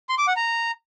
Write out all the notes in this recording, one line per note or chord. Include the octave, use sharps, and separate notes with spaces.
C6
D6
F#5
A#5